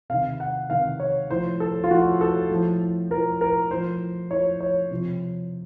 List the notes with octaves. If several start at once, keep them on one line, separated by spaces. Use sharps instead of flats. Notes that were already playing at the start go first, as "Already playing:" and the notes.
C3 D#3 F5
F#5
C3 D#3 F5
C#5
A2 F3 C5
A4
F4
A2 F3 F#4
A4
A2 F3
F3 A#4
A2
A#4
A2 F3 C5
A2 F3 C#5
C#5
C3 F3